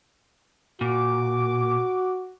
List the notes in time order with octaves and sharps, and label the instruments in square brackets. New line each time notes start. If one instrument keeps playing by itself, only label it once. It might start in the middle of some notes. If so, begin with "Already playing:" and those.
[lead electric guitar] A#2 [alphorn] F#4 [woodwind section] D6